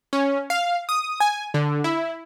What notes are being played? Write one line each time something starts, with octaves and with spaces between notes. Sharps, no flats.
C#4
F5
D#6
G#5
D3
E4